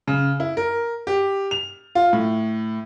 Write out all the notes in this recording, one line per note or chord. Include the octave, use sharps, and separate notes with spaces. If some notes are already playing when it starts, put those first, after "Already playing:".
C#3
E4
A#4
G4
F7
F4
A2